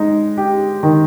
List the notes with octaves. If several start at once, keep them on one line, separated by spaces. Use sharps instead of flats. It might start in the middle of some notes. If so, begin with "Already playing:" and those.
Already playing: G#3 D#4
G4
D#3